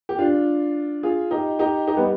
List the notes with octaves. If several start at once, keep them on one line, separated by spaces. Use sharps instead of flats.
G4
D4 F4
F4 G#4
D#4 G4
D#4 G4
D#4 G4
G3 B3